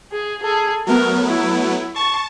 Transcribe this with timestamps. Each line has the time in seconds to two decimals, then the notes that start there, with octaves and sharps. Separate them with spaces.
0.12 G#4
0.42 G#4 A4
0.87 F#3 A3 B3 A#4
1.26 E4
1.96 A5 C#6